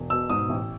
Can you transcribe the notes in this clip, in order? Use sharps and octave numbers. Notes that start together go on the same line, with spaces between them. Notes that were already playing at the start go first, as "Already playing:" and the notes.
Already playing: E1
B2 E6
G#2 D#6
A1